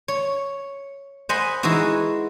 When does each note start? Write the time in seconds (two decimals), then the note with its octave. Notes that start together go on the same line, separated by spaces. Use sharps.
0.08 C#5
1.29 C5 D#5 F#5 G#5 B5
1.63 E3 G#3 D#4 E4 F#4